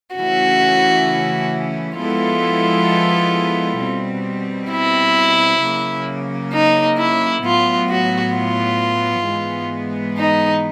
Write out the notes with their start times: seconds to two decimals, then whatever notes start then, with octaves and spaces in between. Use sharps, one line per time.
0.15 C#3 E3 A3 C#4 E4 F#4
1.98 F3 G#3 B3 E4 F4 A4
3.80 B2 G3 C4
4.71 E4
5.62 C#3 F#3 A#3
6.53 D#4
6.98 E4
7.43 A2 F#3 B3 F4
7.90 F#4
8.35 F4
9.26 G#2 E3 G#3 B3
10.18 D#4